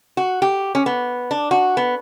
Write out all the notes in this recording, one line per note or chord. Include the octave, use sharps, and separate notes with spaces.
F#4
G4
C#4
B3
D4
F#4
B3